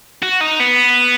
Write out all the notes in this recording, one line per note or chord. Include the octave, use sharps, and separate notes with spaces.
F#4
D#4
B3